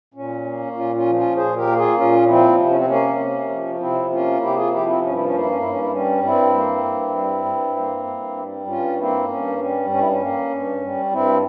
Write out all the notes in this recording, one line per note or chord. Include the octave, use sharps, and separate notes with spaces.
A#2 C#4
A#3
A#2 C#4 F4
C#4 F4
F3
C#4 F4
A#2 G#4 C5
G4 A#4
A#3
F4 G#4
A#2 C#4 F4
F3 C4 E4
C3 E4
C#4
C4
A#3 C#4
C3
F3
C3 C4 E4
A#3 C#4 F4
C3 E4 G4
F4 G#4
F3 E4 G4
C4 E4
G2 C#4
E4
C#4
A#3 E4
C#4
G2 E4
C#4
E4
G3 C#4
G2 C4 E4
A#3
G2
G3
G2
A#3
G2
G3
G2 C#4 F4
A#3 C4 E4
G2 C#4
G3 C#4
G2 C#4
E4
C#4
A#3
G2
G3
G2 C4 E4